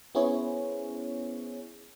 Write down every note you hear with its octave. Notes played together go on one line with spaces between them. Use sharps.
B3 C#4 E4 G#4 C5 C#5